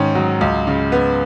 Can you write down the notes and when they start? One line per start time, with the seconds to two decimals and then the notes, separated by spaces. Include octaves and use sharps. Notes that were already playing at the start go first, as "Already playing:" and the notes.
Already playing: G#2 D#3 C#4
0.15 F#3
0.41 C#2
0.67 C#3
0.92 B3